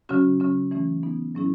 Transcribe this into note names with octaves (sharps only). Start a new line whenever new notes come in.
C#3 F#3 C#4 F#4
C#3 F#3 C#4
E3 A3 C#4
E3 B3 D#4
A2 F#3 C#4 E4 G#4